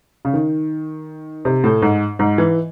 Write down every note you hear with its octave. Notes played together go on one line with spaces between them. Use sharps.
C#3
D#3
C3
A2
G#2
G#2
E3